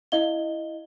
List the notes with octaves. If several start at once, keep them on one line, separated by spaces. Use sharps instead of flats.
E4 D#5 F5 G7